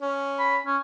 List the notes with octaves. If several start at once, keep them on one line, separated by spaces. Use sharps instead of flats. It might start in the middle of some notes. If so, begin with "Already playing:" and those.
C#4
B5
C#4